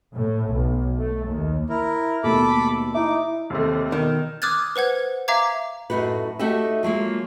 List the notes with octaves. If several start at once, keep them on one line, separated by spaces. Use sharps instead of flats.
A2
B1
A3
D#2
E4 A#4
D#2 B2 A3 A4 B5 D6
D#4 E4 E5 D6
D#2 C3 A3
B2 D#3
D6 D#6 F6 F#6 G#6 A6
B4 C5 F#5 G#6
E5 F5 A#5 D6 G#6
F#2 A2 D#4 F#4 B4
A3 D#4 F#4 G4 E5
F3 F#3 G#3 A#3